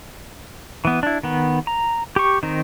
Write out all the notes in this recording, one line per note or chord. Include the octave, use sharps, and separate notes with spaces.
E3 B3
D4 E4
D#3 B3
A#5
G4 C#6
D#3 C4 D#4